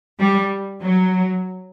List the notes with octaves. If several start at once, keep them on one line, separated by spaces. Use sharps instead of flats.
G3
F#3